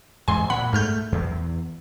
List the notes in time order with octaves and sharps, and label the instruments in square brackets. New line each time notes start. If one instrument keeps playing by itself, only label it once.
[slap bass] E2 G#2 [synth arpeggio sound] G#5 C6
[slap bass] A#2 [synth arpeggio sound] F#5 B5
[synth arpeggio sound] G#2 F6 G6 [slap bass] A3
[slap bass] E2